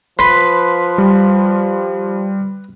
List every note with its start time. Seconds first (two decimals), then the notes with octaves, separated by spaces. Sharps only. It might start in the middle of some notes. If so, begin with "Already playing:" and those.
0.19 F3 B4 C6 B6
0.98 G3